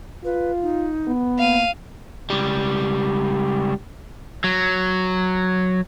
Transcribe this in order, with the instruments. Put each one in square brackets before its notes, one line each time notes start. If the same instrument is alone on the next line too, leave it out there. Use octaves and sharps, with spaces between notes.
[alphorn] F4 [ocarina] B4
[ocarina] D#4
[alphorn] B3
[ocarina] A#3 [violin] F5 D#7
[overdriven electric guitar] C#2 G3
F#3